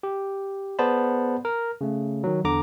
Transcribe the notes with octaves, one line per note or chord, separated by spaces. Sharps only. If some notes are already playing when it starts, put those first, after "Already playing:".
G4
B3 G#4 C5 D5 A5 B5
A#4
C#3 A3
D#3 F#3
E2 D3 A#5 D6